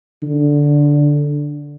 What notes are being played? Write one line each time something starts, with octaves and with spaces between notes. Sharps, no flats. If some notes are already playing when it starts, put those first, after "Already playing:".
D3